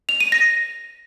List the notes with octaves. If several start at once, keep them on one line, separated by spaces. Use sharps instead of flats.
F7
D#7
A#6